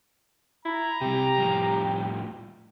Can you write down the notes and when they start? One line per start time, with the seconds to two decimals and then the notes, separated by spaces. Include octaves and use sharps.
0.65 E4 A#5
1.02 C3 G3 G4
1.38 A2 F3 G3